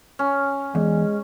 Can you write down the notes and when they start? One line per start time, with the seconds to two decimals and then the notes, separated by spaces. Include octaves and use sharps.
0.19 C#4
0.75 E2 G#3